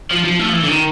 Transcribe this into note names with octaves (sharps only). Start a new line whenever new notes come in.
F3
F3
A3
F3
E3
D3
D#3